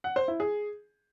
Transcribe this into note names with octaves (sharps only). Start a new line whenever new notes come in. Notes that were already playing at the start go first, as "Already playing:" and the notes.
F#5
C5
E4
G#4